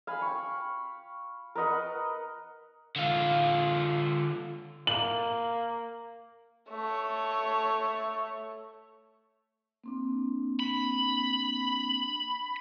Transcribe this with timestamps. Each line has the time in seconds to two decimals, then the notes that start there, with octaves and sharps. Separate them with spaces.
0.07 F5 G#5 B5
0.22 G5 C#6
1.55 A#4 B4 D#5 F#5
2.96 D3 F4
4.87 A#3 F#7
6.70 A3 C#5
9.84 A#3 C4 D4
10.59 B5